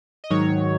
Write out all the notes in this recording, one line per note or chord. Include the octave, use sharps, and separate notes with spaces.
D#5
G#2 D#3 F#3 C#5